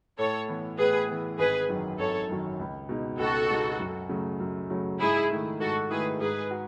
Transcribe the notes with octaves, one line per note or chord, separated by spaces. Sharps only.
A2 A4 C#5
E3 B3
A2 G#4 B4
E3 B3
G#1 G#4 B4
F#2 D#3 F#3
G#1 A4 C#5
F#2 D#3 F#3
C#2
B2 G#3 B3 D#4
C#2 F#4 A4
B2 G#3 B3 D#4
F#2
C#3 F#3 A3
F#2
C#3 F#3 A3
G#2 E4 G#4
D#3 A3 E4
G#2 F#4 A4
D#3 A3 E4 G#4 B4
G#2 G#4 B4
F#4